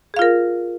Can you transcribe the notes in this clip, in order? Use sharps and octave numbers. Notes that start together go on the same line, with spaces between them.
F4 G#4 A#4 F5